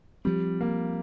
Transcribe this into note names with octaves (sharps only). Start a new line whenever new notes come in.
F3 G3 C4
A#3